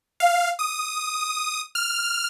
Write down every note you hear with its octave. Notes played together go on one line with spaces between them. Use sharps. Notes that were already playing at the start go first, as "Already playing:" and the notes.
F5
D#6
F6